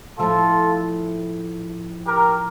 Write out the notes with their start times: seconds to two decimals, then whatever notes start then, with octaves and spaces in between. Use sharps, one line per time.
0.19 A2 F3 A3 F4 A4
2.07 G4 A#4